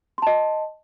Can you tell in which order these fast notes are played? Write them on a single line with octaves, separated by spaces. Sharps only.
C6 A5 D#5